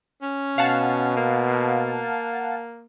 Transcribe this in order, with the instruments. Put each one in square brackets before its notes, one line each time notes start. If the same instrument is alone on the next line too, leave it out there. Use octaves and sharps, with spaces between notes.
[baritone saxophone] C#4
[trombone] B2 [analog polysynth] F5 F#5 A5
[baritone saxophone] A#3